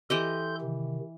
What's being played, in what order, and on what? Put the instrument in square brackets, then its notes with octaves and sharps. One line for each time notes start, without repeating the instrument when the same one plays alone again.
[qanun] E3 G4 D#5 [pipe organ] A4 C6 G6
[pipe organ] C3 D#3